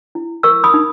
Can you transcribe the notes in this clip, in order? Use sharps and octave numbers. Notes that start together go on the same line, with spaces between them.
E4
A#4 C#6 E6
B5 D#6
D#4